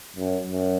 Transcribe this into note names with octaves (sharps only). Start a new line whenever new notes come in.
F#2
F#2